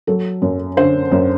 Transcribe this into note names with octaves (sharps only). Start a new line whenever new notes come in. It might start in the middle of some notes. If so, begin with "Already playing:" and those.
F#3 A4
F#2
D3 C5
F#2